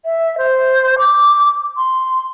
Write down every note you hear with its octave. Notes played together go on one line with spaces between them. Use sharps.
E5
C5
D6
C6